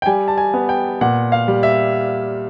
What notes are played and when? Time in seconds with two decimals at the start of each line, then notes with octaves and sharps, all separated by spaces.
0.02 G5
0.06 G3 G#5
0.28 A5
0.38 G#5
0.54 B3
0.69 G5
1.01 A#2 F#5
1.32 F5
1.48 G3
1.63 E5